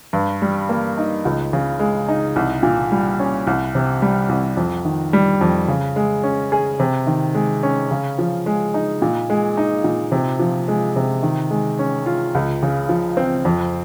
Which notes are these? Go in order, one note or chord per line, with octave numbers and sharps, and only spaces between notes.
G2
G3
A#3
D#4
C#2
C#3
G#3
D#4
C2
A#2
G3
C#4
C2
C3
G3
C2
F2
D#3
G3
F2
C#3
G#3
C#4
G#4
C3
D#3
G#3
C#4
C#3
F3
G#3
D#4
A#2
G#3
D#4
A#2
C3
F3
G#3
C3
D#3
G#3
C#4
F4
C#2
C#3
F3
C4
F2